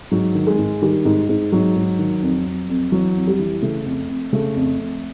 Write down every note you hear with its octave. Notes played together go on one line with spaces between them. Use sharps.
G#2 F#3
D#3
G#3
G#2
D#3 G3
G#2
G#2
G#2 F#3
G#2
D#3
F2
F2
F2
E3 F#3
F2
G3
E3
C#3 A3
F2
F2
C#3 A3
F2
F2